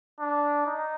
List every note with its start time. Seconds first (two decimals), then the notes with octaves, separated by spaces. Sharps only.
0.20 D4
0.66 D#4